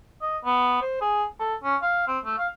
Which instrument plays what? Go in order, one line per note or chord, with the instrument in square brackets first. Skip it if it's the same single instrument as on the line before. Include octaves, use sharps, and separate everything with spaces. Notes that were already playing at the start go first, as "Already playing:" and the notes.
[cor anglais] D#5
B3
C5
G#4
A4
C#4
F5
C4
A3
F5